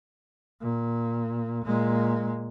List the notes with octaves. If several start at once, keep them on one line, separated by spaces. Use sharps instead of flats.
A#2
A#2 G#3